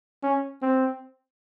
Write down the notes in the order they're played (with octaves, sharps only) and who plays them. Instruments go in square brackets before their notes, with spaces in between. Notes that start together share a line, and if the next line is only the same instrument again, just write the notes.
[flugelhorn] C#4
C4